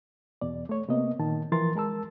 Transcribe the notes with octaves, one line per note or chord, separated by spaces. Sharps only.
E2 B2 D5
A3 C#5
C3 A#3 B3 D#5
A#2 D#3 A5
E3 F3 A#4 C6 A6
G#3 A#4 A5 E6